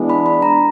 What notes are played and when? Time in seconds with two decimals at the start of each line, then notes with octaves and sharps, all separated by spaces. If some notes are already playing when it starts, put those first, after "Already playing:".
Already playing: E3 G#3 B3 D4
0.10 B5
0.26 B5
0.42 A#5